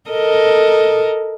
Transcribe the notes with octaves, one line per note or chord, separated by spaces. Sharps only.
A4 A#4 D#5